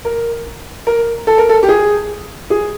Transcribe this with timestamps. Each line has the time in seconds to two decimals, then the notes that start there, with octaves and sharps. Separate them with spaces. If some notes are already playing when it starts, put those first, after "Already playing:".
0.05 A#4
0.87 A#4
1.27 A4
1.38 A#4
1.49 A4
1.63 G4
1.69 G#4
2.50 G#4